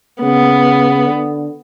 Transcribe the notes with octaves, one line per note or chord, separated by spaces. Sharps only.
C#3 B3
D3